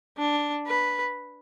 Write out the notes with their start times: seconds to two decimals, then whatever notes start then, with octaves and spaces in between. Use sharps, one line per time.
0.18 D4
0.67 B4